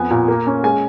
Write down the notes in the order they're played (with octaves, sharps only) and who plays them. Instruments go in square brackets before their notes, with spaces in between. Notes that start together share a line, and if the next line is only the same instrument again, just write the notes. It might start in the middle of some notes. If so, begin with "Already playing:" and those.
Already playing: [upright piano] F2 B3 G#5
A#2
A#3
C#4
G#3 G#5